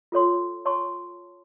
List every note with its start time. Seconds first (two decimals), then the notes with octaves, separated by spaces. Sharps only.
0.12 F4 A4 C#5 C6
0.65 C#5 A5 C6 C#6